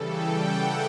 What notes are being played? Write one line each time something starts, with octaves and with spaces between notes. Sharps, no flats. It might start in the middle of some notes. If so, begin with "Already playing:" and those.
Already playing: C#3 E3 G3 A4
G5
F#5